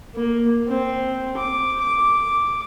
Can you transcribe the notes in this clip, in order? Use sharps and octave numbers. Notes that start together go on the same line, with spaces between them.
A#3
C4
D6
D6